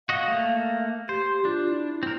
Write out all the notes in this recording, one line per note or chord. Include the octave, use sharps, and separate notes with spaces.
F#4 D#5 F5
A3 A#3
G4 C5
D4 F4
E4
C4 A#4